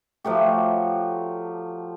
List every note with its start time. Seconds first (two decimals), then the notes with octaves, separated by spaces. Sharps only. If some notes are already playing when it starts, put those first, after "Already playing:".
0.24 F3 F#3 A3 G4